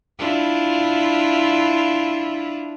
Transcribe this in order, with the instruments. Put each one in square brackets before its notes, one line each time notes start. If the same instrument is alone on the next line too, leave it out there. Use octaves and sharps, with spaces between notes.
[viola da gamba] D4 E4 F4